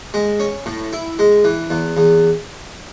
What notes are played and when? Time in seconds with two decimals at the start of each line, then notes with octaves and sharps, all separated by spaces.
0.14 G#3
0.40 C#4
0.66 A2
0.93 E4
1.19 G#3
1.44 E3
1.70 E2
1.97 E2